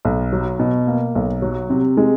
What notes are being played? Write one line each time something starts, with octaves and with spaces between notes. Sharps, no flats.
B1
F#3
B2
A#3
B1
F#3
C3
G#3